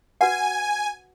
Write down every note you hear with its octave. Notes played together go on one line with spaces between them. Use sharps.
F#4 B4 F#5 G#5